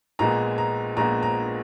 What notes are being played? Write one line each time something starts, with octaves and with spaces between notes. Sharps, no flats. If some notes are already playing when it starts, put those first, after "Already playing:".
A#1 A#2 G#3 B3 A#5
A#5
A#1 A#2 G#3 B3 A#5
A#5